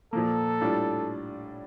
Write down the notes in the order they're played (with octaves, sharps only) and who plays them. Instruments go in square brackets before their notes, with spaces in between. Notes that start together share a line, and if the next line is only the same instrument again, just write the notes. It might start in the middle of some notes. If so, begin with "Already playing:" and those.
[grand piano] A#2 F3 A#3 [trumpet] A4
[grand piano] A2 G3 D4 F4